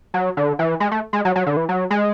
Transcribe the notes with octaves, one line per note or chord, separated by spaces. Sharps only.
F#3
D3
E3
G#3
A3
G#3
F#3
F#3
D3
E3
F#3
G#3